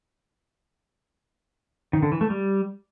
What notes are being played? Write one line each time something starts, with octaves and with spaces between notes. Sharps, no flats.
D#3
D3
E3
A3
G3